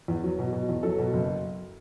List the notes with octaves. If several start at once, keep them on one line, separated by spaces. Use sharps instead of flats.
E2
F#3
B2
B2
E2
F#3 A4
B2
F#1